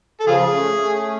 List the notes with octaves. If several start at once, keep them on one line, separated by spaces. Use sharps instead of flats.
A4
C#3 F3 F4 G#4
A3 C#4
A3 C#4